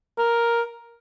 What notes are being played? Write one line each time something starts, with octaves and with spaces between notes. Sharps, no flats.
A#4